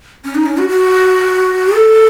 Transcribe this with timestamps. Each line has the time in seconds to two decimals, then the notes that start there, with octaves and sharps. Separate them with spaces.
0.25 C#4
0.35 D#4
0.46 C#4
0.58 F#4
0.69 F#4
1.74 A4